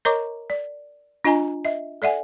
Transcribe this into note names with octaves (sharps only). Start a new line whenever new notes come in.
A#4 C#5 D#5 A#5 C#6 D6
D5
D4 F4 D#5 G#5 A#5
D#5 E5
A4 D5 E5 F#5 G#5